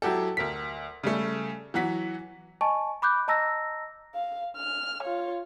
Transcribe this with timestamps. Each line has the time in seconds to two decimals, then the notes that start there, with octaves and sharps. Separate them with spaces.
0.02 F#3 E4 F#4 G4 A4
0.37 D2 A#4 B6
1.03 C#3 G3 A3
1.74 E3 F#3 F#4 B6
2.61 D#5 G#5 A5 C#6
3.02 B5 D6 F#6 G6
3.28 D#5 A5 A#5 E6 A#6
4.15 F5
4.57 F6
5.03 F4 C#5